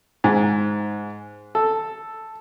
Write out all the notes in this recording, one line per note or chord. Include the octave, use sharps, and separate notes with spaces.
G#2
A4